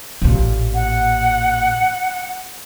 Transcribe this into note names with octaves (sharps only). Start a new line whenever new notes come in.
A1 A#2
F#5